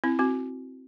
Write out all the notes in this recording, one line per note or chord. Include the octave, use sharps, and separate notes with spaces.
C4 E4
C4 F#4